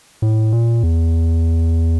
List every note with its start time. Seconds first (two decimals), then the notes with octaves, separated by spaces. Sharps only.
0.22 A2
0.52 A#2
0.83 E2